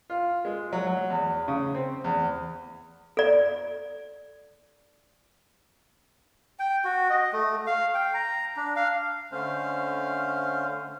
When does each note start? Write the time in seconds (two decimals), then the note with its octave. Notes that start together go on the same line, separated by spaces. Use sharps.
0.10 F4
0.45 G#3
0.73 F#3
0.87 F#3
1.10 E2
1.48 C#3
1.75 C4
2.04 E2
3.17 A4 D5
6.59 G5
6.85 F#4
7.10 D#5
7.33 A3
7.67 F5
7.94 G5
8.14 A#5
8.57 D4
8.76 F5
9.32 D3 A3 C#4 C5 F5